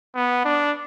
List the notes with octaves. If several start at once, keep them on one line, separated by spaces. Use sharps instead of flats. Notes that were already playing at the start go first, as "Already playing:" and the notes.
B3
D4